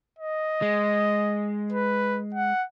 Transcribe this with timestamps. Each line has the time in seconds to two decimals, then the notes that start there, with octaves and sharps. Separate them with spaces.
0.18 D#5
0.62 G#3
1.72 B4
2.34 F#5